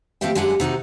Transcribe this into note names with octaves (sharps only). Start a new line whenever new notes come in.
F3 A3 C4 G4 E5 G5
F#2 G#3 D4 G4 F#5 G#5
C3 D#4 F#4 G4